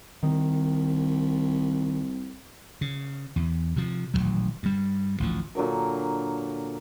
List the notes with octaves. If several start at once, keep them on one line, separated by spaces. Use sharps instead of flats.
C2 D#3
C#3
E2
C3 F3
D#1 A1 G#2 F#3
G2 G3
A1 D2 F3
A#2 D3 F#3 A#4